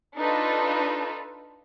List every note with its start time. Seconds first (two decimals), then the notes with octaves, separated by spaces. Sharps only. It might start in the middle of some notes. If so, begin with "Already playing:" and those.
0.18 D4 D#4 F4 A4 B4